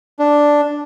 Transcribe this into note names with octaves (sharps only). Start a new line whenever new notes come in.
D4